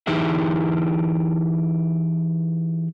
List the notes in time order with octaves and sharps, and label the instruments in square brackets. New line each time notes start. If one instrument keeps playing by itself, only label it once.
[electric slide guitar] E3 D#4 E4 G4 G#4 E5